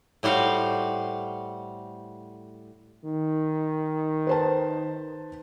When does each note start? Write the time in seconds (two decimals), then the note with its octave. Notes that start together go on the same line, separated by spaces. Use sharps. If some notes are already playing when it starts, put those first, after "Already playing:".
0.23 A2 G3 F#4 C5 F5
3.05 D#3
4.27 B4 C5 A5